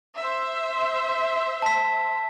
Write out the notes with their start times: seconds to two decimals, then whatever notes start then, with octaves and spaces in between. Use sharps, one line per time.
0.17 C5 E5
1.62 A5 B6